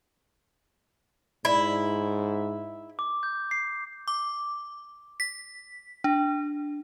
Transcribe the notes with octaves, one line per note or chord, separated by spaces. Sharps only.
G#2 E4
D6
G6
C7
D6
B6
D4